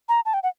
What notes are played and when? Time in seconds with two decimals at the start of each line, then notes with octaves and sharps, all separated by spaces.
0.09 A#5
0.25 A5
0.34 G5
0.43 F#5